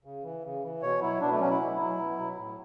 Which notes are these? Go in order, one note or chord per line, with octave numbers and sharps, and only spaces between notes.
C#3
E3
C#3
E3
B2 C#5
F#3 E4
B2 D4
A3
F#3 C#4
E4
B2
F#3
B2
F#3
A2